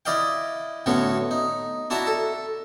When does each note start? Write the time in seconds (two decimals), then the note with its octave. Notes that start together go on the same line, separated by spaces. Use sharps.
0.06 E4 D5 D#5 F5 G5
0.86 A2 D3 B3 C#4 F#4
1.31 D#4
1.90 D4 E4 F#4 A5 A#5
2.07 A4